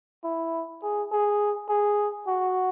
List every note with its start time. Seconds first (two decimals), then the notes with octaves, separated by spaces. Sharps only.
0.24 E4
0.83 G#4
1.12 G#4
1.69 G#4
2.27 F#4